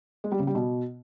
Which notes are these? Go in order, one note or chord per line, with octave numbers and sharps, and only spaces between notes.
G#3
G3
C#3
G3
B2